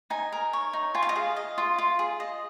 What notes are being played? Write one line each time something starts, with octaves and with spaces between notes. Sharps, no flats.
D#4 G#5
A#4
C#5
D#4
F4 G#5
F5
D#5
G#4 F5
D#5
F4
F4
G#4
D#5